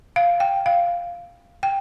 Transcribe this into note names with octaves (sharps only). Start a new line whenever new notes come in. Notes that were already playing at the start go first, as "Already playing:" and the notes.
F5
G5
F5
G5